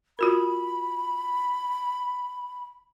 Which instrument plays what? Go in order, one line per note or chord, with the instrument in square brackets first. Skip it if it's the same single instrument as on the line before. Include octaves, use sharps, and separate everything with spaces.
[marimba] F4 F#4 A#4 [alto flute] B5